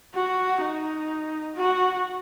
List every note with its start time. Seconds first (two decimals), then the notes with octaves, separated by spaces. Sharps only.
0.14 F#4
0.61 D#4
1.56 F#4